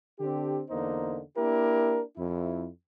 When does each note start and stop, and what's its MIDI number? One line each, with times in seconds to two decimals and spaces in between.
0.20 0.63 50
0.20 0.63 60
0.20 0.63 62
0.20 0.63 67
0.70 1.20 40
0.70 1.20 50
0.70 1.20 58
0.70 1.20 63
0.70 1.20 72
1.37 2.01 58
1.37 2.01 62
1.37 2.01 64
1.37 2.01 67
1.37 2.01 70
2.17 2.68 41
2.17 2.68 64